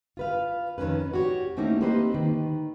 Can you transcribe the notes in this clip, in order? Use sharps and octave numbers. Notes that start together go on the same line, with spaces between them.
F4 B4 F5
F2 D#3 A#3 C#4 B4
F#4 G4 C#5
E3 A3 A#3 C4 C#4 D#4
A#3 C4 G4 B4 C5 D#5
D#3 B4